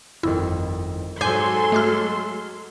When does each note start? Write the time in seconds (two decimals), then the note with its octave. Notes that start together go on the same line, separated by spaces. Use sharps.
0.23 G1 F2 D#3 E4
1.21 G#2 F#3 A4 G#5 C6 D6 G6 D#7
1.72 G#3 A3 D6 F6